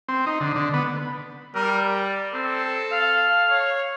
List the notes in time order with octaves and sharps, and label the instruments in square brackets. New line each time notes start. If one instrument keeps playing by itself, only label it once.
[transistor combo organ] C4
D#4
D3
D3
B3
[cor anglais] G3 [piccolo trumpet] A#4
[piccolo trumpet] D5
[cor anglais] C4 [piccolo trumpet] A4
[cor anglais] F5
[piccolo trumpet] C#5